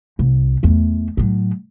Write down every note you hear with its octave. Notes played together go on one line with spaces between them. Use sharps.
C2
E2 A3
A2 F#3